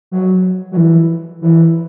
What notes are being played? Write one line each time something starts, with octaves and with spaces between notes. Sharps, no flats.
F#3
F#3
E3
E3